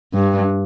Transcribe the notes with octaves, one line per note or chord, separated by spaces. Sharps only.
G2